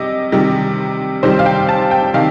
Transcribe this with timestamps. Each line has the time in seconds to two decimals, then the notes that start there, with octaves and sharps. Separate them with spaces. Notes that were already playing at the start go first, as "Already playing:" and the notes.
Already playing: C3 G3 D#5
0.32 C3 D#3 G3
1.23 C3 D#3 G3 C5
1.39 F5
1.46 G5
1.69 A5
1.91 G5
2.14 C3 D#3 F5